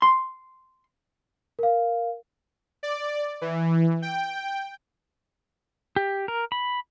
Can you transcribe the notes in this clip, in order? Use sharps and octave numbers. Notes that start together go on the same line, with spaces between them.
C6
A#4 F5
D5
E3
G5
G4
A#4
B5